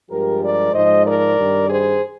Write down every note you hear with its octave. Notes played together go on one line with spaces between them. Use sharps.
G2 F3 G#3 G4 A#4
A#4 D5
G#2 F3 G#3 C5 D#5
A#4 D5
G2 D#3 G3
G#4 C5